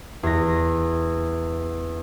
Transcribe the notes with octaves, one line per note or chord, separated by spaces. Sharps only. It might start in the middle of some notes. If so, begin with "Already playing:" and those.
E2 A#6